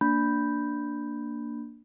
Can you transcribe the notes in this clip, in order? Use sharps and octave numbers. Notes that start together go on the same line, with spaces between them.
A#3 D4 B5 G6